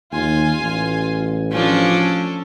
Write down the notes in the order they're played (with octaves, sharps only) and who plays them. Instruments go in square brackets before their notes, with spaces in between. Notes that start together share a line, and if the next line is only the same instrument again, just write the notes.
[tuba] D#2 [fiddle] F4 G#5
[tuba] A1
[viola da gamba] F3 D4 [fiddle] C#4 A4